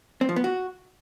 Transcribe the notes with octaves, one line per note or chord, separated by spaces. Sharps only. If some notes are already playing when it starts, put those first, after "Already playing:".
C4
F3
B3
F#4